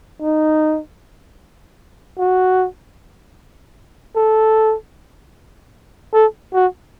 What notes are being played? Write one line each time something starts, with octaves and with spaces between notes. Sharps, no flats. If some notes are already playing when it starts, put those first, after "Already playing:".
D#4
F#4
A4
A4
F#4